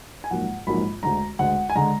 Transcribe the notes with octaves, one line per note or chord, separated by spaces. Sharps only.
G#5
A#1 G#2 F#3 A#3 F#5
A#1 G#2 F#3 A#3 B5
D2 D3 G#3 A#5
D2 D3 G#3 F#5
G#5
D3 G#3 A#5